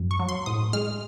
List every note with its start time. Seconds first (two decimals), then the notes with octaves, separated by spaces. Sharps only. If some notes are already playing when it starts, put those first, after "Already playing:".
Already playing: F#2
0.11 C#6
0.19 F#3
0.29 C6
0.46 A2 D#6
0.73 G#3 F6